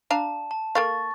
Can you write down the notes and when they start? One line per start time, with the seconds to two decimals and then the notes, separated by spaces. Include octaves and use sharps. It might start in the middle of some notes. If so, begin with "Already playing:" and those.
0.11 D4 F5 A5 A#5
0.51 A5
0.75 A#3 A4 F5 C#6 A6